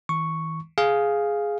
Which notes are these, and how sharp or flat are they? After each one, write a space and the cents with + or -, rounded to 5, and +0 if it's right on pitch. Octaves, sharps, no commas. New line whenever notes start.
E3 -40 C#6 +0
G#4 +5 F5 +0